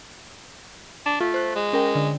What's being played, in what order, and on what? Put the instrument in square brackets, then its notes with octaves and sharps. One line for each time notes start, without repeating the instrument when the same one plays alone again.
[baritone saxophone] D4
[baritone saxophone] A3 [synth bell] F4
[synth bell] C5 F#6
[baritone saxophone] G#3
[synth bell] C#4 A#4 G5
D3